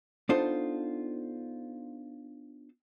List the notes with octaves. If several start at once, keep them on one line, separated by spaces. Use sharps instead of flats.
B3 D4 D#4 F4 A4 C5